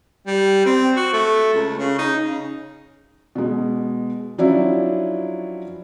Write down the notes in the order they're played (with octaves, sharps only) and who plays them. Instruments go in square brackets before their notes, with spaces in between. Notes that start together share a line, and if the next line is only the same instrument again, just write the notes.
[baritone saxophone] G3
C4
F#4
A3
C#2
C#3
D#4
C#3
[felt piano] B2 G#3
F3 F#3 C#4 D4 E4